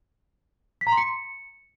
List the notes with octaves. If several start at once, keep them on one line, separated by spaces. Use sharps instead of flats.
B6
A#5
C6
C#7